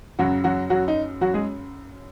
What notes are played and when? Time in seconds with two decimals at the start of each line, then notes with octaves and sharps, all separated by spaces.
0.19 F#2 C#3 F#3 F#4
0.44 F#3 F#4
0.70 F#3 F#4
0.88 D#4
1.21 F#3 F#4
1.34 G#3 G#4